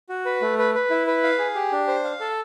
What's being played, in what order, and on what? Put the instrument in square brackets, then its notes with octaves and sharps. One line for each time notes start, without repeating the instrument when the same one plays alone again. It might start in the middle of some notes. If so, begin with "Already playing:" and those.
[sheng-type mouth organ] F#4
B4
A3
B4
B4
E4
B4
F5
G#4
G4
D4
C5
F5
A4